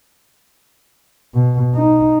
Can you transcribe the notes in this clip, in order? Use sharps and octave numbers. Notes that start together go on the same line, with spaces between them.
B2
D#4